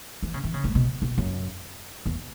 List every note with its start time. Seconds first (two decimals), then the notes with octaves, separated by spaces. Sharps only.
0.23 E3
0.34 C#3
0.44 E3
0.54 C#3
0.64 G#2
0.75 B2
1.02 B2
1.18 F#2
2.06 E2